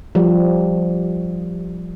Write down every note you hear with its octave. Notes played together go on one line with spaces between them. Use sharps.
F3 G3